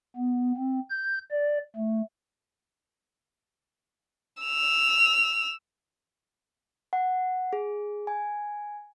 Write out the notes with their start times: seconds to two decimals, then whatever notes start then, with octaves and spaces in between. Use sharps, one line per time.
0.16 B3
0.57 C4
0.90 G6
1.31 D5
1.76 A3
4.43 E6 F7
6.93 F#5
7.53 G#4
8.07 G#5